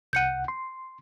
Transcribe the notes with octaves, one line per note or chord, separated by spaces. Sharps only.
C2 F#5 G6 C#7 D#7
C6